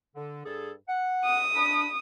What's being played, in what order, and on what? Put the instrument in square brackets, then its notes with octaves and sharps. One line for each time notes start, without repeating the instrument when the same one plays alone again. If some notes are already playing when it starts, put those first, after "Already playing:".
[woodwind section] D3
G2 G#4 A4
F#5
[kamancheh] D#6
[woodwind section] D4 B5